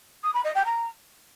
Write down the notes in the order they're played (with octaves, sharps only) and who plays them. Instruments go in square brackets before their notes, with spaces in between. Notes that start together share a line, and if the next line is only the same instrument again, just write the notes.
[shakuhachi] D#6
B5
D#5
G5
A#5